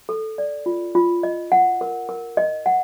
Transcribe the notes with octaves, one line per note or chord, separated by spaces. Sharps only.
A4
D5
F4
F4
D#5
F#5
A#4
A#4
D#5
F#5